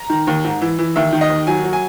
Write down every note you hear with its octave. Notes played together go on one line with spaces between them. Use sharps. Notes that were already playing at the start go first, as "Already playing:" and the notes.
Already playing: A#5
D#3
D#2
G#2
E3
E3
D#2 E5
D#3
D#5
D#2
F#3 G#5
F#3
G#5